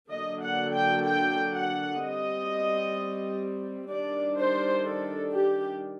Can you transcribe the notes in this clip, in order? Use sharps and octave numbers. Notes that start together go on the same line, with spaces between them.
D3 F#3 A#3 D4 D#5
F#5
G5
G5
F#5
G3 C4 D#5
D#3 G3 D4 D5
C5
A4
G4